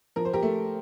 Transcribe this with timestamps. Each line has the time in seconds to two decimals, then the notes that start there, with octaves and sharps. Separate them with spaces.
0.16 F3 A#4
0.25 C5
0.33 G4 A#4
0.43 A3